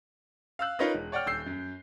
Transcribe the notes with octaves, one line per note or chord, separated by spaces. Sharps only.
F5 E6 F#6
D#4 F4 A#4 B4 C#5 D#5
E1
C#5 D5 F#5 G5 F6
D#1 E6 G6 C7
F#2